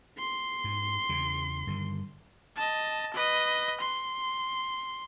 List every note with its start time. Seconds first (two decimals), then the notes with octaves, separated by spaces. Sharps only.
0.18 C6
0.64 G#2
1.09 E2 C#3
1.67 G2 D3 D#3
2.56 D#5 A5
3.14 B4 D#5
3.81 C6